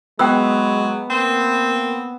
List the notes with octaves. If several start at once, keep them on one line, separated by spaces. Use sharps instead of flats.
F#3 G#3 B3 G5 E6
A#3 C4